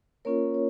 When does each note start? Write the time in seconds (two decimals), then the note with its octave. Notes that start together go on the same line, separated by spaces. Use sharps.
0.25 A#3 C#4 F4 A#4 C#5
0.55 C#5